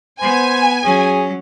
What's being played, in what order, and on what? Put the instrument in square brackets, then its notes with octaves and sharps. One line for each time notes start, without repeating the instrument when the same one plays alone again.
[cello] B3 [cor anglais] C5 [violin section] G#5
[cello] F#3 C#4 [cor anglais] G#4